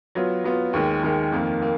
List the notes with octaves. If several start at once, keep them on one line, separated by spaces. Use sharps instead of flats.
F#3 B3 F4
F#3 B3 F4
D#2 D#3 G#3
D#2 D#3 G#3
F2 D#3 A#3
A#3